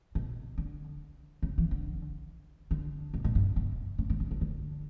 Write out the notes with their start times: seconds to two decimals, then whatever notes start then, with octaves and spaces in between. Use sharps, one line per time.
0.15 B2
0.58 D3
1.43 C#3
1.58 E3
1.71 D3
2.71 D3
3.14 B2
3.24 B2
3.35 G2
3.56 B2
3.98 C#3
4.10 D3
4.20 D3
4.31 D3
4.41 D3